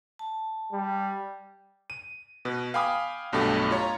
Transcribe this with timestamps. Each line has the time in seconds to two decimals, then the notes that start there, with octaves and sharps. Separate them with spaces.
0.19 A5
0.72 G3
1.90 D#7
2.45 B2 B4
2.74 F5 G5 G#5 B5 D6 D#6
3.32 B1 G2 B2 A3 G4
3.71 F4 C#5 A#5